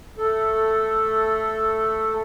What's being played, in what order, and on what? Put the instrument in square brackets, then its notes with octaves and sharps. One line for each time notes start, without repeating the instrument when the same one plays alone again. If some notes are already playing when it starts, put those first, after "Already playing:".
[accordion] A3 A4